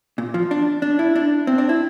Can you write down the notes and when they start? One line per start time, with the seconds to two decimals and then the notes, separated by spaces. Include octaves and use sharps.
0.18 A#2
0.34 F3
0.51 D4
0.82 D4
0.99 E4
1.16 D4
1.47 C4
1.58 D4
1.69 E4